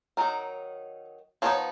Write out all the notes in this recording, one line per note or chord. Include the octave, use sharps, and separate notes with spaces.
D#3 F#3 D#4 A#4
F3 B3 D#4 C#5